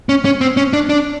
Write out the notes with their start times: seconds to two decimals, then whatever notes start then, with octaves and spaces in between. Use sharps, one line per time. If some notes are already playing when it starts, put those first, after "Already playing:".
0.09 C#4
0.25 C#4
0.41 C4
0.57 C#4
0.73 D4
0.89 D4